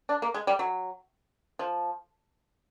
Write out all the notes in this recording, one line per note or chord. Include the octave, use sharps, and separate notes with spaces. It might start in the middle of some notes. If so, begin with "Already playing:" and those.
D4
A#3
G#3
G3
F#3
F3